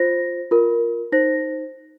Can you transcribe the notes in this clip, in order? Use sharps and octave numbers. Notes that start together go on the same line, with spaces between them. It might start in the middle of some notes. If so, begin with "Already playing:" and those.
Already playing: F4 C5 A#6
F4 A#4
D#4 C5 A#6